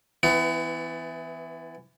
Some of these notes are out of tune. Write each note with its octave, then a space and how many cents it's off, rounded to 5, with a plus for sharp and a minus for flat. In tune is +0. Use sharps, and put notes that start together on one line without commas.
E3 +0 B3 +30